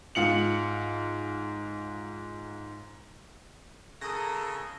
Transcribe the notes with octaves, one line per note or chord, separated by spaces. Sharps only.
G#2 F4 C#7 F#7
C#3 A4 A#4 D#6 A#6